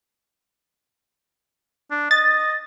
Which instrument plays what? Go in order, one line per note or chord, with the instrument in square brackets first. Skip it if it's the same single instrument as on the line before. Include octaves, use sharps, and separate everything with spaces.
[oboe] D4
[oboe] D#5 [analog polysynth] A6